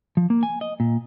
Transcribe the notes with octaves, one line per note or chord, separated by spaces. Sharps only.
F3
A#3
G#5
D#5
A#2